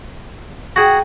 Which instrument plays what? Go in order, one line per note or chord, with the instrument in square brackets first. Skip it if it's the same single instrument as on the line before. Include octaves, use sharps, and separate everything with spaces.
[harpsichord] F#4 G#4 [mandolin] D5 G5 A#5